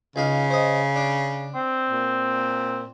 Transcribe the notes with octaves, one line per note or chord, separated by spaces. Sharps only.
C#2 C#3 D#4 F5
C5 D#5
D4
C4
A#2